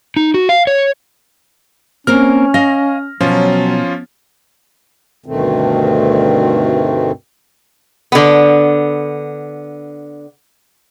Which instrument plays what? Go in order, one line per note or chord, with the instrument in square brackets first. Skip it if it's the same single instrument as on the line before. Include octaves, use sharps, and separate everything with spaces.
[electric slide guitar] D#4
F#4
F5
C#5
[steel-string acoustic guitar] A#3 C4 A#4 [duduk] C#4 [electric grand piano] F6
[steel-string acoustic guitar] D#5 F5 [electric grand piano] A#6
[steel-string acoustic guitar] B2 [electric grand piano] F3 C#4 F4 [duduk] F#3
[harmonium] D2 G2 B2 D#3 A3 C4
[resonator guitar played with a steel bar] D3 B3